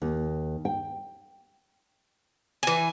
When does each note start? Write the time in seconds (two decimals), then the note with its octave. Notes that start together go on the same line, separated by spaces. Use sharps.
0.02 D#2
0.65 G5
2.63 E3 G#5